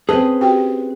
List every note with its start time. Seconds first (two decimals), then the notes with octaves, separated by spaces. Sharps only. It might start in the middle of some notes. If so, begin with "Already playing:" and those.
0.09 C4 C#4 G#4 B4 D#5 A5
0.41 F#4 G4 G5